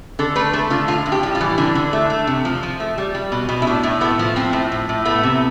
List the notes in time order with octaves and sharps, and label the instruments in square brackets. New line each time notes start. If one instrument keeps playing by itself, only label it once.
[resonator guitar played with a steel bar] D3 A4
A3 B4
A3 A4
D3 F4
A2 F4
A2
G4
G3
F4
E3
D3 D4
D3
A3
A3
C3
F3
F3
A3
G3
G3
B2
B2
E4
A2 D4
A2
A3 B3
F3
A2 C4
A2
A2
A2
A3 B3
C3